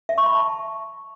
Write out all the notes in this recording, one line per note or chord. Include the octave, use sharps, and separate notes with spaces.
E5
C#6
B5
A5